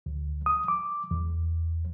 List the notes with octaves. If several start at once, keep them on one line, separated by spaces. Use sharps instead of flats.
D2
D#6
D6
E2